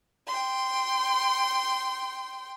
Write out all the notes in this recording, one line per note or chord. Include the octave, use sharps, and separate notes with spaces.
G5 C6